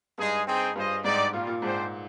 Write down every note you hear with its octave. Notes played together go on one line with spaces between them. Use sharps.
G2 G#3 D#4 G#4
C4 D#4 G#4 C5 G5
G2 F4 G#4 C5 D#5
G#2 C4 D#4 G4 D5
A#2 G3 A#3 F4
A#2
G#2 D4 G#4 C5 G5